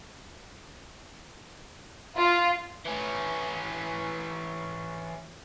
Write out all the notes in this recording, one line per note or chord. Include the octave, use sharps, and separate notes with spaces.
F4
E3 C#4